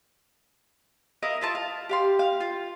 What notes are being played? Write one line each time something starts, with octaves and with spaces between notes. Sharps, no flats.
E4 A#4 D#5 F5
E4 F4 A5
F5
G4 F5 C6
F5
F4